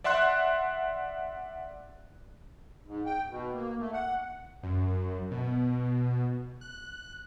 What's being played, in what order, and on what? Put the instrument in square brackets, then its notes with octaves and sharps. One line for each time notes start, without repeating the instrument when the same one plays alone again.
[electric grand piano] D5 E5 F#5 C6 F#6
[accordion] G#2
G5
B2
A#3
A3
F#5
[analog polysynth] F#2
B2
F#6